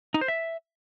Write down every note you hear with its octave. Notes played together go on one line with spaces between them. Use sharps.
D#4
C5
E5